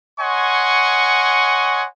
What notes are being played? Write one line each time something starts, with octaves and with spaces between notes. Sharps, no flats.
C#5 D#5 F#5 G#5 C6 C#6